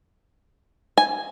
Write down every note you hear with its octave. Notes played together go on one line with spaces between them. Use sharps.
G#5